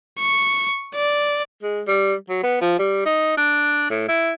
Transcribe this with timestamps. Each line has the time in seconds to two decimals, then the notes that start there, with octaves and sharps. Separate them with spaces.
0.20 C#6
0.95 D5
1.63 G#3
1.88 G3
2.29 F#3
2.43 B3
2.61 F3
2.79 G3
3.06 D#4
3.38 D4
3.90 A2
4.09 E4